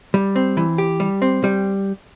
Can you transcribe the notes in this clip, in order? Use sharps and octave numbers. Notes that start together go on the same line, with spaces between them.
G3
C4
E3
G4
G3
C4
G3